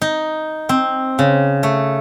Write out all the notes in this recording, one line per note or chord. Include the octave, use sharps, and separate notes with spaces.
D#4
C4
C#3
A3